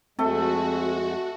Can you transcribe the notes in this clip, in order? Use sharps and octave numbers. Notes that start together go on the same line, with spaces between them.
F2 G#3 A3 C4 F#4